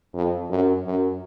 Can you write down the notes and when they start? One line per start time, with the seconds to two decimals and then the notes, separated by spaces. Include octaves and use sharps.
0.14 F2
0.50 F#2
0.86 F#2